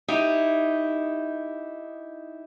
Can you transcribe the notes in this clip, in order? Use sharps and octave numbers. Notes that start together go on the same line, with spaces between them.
D#4 E4 G4